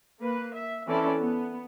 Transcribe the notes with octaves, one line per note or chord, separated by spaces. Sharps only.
A#3 B4
E5
E3 C4 C#4 E4 A4 D5
B3